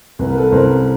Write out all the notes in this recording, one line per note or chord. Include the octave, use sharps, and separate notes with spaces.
C2 B4
A#4
A4 B4
C2 A#4 C5